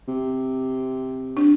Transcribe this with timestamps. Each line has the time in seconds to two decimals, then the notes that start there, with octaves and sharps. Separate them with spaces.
0.08 C3
1.37 D4